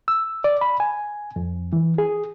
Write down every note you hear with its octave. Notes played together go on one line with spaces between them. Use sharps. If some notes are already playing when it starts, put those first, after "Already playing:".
E6
D5
B5
G#5
F2
E3
G#4